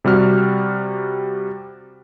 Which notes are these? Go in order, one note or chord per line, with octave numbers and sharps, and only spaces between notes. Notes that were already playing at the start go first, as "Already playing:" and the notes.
C3 G3 F#4 F6